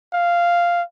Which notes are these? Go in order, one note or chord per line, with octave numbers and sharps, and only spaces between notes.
F5